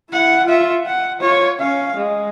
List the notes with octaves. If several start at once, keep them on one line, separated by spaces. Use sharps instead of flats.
E4 F#5
F4 E5
F#5
F4 C#5
C#4 F5
G#3